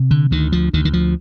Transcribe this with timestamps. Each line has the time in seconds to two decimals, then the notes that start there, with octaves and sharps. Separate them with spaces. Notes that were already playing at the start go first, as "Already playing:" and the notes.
Already playing: C3
0.11 D3
0.31 D2 D#3
0.52 F3
0.73 D2 D#3
0.85 D#3
0.93 F3